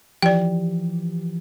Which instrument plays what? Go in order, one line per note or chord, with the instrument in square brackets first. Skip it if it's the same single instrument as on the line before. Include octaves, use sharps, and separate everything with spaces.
[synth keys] E3 F3 G4 [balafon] D5 G5